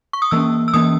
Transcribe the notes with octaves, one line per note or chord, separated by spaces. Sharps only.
C#6
D#6
E3 A#3 C#4 E6
E6
E3 A#3 C#4 D#6